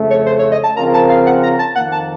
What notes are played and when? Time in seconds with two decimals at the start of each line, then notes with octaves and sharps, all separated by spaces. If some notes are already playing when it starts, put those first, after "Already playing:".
Already playing: F2 C#3 A3
0.10 C#5
0.26 C5
0.39 C#5
0.52 D#5
0.64 A5
0.77 C#3 F3 C4 F4 A#4 A#5
0.94 A5
1.09 F5
1.26 F#5
1.43 A#5
1.59 A5
1.75 F2 D#3 A#3 F#5
1.92 A5